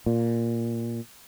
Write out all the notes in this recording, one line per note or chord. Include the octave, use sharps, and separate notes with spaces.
A#2